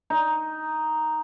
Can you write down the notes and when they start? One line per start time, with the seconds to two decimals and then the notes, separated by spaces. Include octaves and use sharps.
0.10 D#4